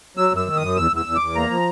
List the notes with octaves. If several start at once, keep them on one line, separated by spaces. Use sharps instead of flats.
F#3 E6
F#2 E6
D#3
D#6
F#2
E2 E6
E2
E6
E2
D6
E2
A#3 A#5
F3